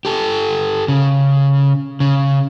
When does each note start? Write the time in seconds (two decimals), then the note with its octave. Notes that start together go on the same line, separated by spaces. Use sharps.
0.05 G4 A4
0.88 C#3
2.00 C#3